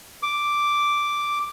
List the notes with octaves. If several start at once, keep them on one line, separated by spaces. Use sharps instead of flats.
D6